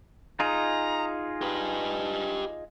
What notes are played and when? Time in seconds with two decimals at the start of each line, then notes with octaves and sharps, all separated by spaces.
0.40 D#4 F4 G#4 A#5
1.42 G4 B4